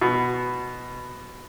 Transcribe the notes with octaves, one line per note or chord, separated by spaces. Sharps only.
B2